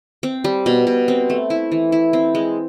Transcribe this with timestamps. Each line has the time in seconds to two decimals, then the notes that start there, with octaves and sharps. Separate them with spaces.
0.23 C4
0.44 G3
0.66 B2
0.87 B2
1.08 C4
1.30 A3
1.50 E4
1.72 E3
1.92 E4
2.13 C4
2.35 G#3